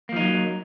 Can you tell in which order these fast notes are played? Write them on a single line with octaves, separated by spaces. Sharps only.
A#3 F3 D#4 F#3